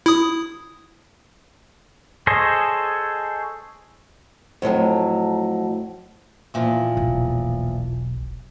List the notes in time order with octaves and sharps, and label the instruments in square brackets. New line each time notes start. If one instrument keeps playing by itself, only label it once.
[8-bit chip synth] E4 D#6
[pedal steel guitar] G#4 A4 C5 C#5 D#5
[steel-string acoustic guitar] F2 A2 F3 F#3
E2 A#2 F3
[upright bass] E1 B1